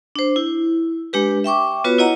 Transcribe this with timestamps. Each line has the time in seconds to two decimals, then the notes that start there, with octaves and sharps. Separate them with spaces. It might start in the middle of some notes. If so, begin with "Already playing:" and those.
0.16 D4 C5
0.36 E4
1.13 G#3 D4 G4 B4
1.44 E5 G5 C#6 D6
1.84 B3 F4 F#4 B4 C#5
1.98 E4 C#5 D#5 F#5 A#5